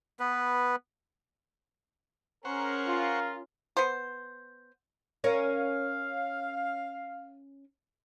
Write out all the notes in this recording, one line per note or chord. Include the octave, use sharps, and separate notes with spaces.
B3 B4
C#4 G#4 A#4 C5 F#5 C#6
F4
B3 C5
C#4 A#4 C#5 F5